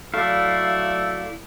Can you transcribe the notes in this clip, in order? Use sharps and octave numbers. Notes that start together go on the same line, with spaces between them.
F#3 A3 E4 D5 F5